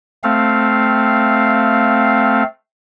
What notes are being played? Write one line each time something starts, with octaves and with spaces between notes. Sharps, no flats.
A3 C4 F5